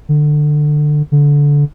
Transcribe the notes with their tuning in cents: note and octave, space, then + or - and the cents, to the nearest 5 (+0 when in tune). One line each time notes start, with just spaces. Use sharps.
D3 +20
D3 -20